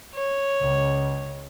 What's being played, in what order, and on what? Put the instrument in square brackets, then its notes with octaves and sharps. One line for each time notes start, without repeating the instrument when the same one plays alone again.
[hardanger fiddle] C#5
[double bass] C#2 C#3